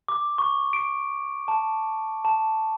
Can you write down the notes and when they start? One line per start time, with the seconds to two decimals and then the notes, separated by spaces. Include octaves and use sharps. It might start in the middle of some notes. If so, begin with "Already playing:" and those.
0.08 D6
0.38 C#6
0.73 D7
1.48 A5
2.25 A5